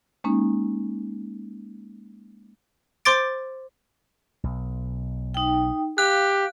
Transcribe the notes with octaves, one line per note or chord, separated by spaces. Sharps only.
G#3 A#3 C#4 D#4
C5 C6 D6 A6 D7
B1
D#4 G5
G4 F5 F#6